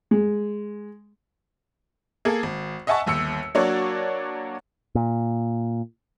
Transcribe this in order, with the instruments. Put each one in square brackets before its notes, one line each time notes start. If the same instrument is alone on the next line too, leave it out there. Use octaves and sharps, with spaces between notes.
[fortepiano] G#3
[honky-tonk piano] A#3 G#4 A4
G#1
D#5 E5 F#5 G#5 A5 C#6
G1 D#2 E6 C#7
F#3 A#3 D4 F#4 C#5 D5
[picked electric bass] A#2